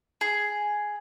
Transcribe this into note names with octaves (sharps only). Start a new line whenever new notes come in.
G#4